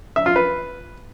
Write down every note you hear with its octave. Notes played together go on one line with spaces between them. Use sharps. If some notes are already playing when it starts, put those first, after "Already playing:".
E5
F4
B4